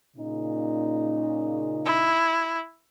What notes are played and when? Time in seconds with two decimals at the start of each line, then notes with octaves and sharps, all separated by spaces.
0.17 A#2 C#3 D#4
1.85 E4